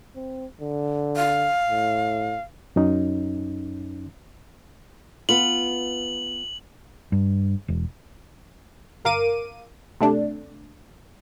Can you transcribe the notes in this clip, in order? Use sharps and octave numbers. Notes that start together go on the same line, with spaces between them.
C4
D3
F5
A2
F#2 C#4 D#4
B3 F4 F#7
G2
E1
G1 A#4 F5 D6 D#7
C3 A3 D4